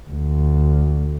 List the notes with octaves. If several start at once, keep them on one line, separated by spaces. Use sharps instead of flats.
D2